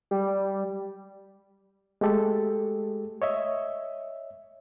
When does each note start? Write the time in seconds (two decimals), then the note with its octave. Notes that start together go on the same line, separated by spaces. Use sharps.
0.11 G3
2.01 G#3 A3 G4 A4
3.22 C#5 D#5 E5